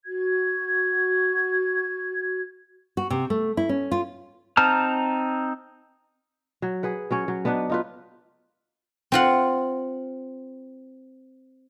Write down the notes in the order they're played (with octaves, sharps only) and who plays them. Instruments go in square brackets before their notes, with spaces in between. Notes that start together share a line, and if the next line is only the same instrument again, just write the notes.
[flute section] F#4 G#6
[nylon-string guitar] F#4
C3
A3
E4
C#4
F4
[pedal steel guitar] C4 D#4 A5 A#5 F6
[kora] F#3
G#4 B4 F#5
F#3 C#4 C#5
F#3
B3 D4 D#4 B4
D#4 F4 B4
[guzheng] C4 F4 F#5